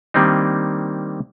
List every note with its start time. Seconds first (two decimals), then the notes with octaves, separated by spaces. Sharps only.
0.14 D#3 G3 A#3 C4 D4 D#4